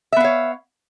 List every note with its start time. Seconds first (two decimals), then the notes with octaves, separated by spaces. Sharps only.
0.13 E5
0.16 B3
0.20 F5
0.24 C#5